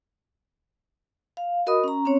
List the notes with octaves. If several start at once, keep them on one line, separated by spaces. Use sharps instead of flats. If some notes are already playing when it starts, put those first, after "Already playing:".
F5
F#4 A#4 D#5 B5 D#6
C#4 A#5
C4 C#4 C#5